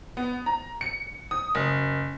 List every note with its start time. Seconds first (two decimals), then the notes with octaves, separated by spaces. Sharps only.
0.17 B3
0.46 A#5
0.81 C#7
1.31 D#6
1.55 F#1